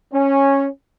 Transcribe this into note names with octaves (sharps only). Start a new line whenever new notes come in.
C#4